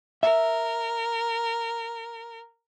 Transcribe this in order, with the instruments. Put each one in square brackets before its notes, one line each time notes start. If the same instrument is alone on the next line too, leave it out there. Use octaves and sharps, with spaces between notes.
[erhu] A#4 [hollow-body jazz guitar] E5